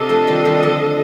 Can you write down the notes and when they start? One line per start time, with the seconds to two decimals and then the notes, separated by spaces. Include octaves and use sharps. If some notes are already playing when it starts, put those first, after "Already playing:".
Already playing: C3 D4 F4 A4 D#5
0.09 F3 A3
0.27 D#3 G3
0.45 D#3 G3
0.63 D3 F3